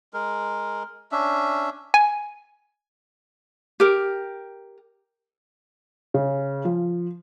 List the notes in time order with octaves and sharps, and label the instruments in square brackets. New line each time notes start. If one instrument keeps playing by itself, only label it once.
[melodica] G#3 A#4
C#4 D4 E5
[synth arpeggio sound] G#5
[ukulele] G4 A#4
[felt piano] C#3
F3